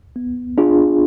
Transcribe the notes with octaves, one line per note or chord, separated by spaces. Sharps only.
B3
D4 F4 G#4